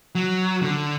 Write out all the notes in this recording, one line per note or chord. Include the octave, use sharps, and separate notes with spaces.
F#3
D3